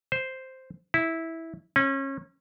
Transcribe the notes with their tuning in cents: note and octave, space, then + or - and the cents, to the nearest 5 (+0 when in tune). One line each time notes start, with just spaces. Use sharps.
C5 +0
E4 -10
C#4 -30